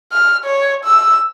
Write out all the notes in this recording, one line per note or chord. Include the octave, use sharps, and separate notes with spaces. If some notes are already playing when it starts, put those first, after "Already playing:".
F6
C#5
E6